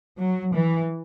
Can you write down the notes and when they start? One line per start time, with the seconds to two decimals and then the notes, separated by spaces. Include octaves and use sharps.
0.19 F#3
0.54 E3